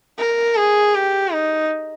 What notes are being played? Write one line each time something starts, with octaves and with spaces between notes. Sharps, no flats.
A#4
G#4
G4
D#4